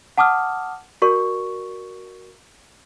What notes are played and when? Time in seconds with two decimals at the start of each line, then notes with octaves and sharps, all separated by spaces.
0.18 F#5 A5 D6 D#6 F6
1.02 F#4 A#4 D5 C#6